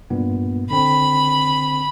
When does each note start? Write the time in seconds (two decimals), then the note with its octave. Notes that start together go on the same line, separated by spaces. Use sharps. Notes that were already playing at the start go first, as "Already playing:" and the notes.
0.10 G2 A#2 B3
0.71 D3 C4 B5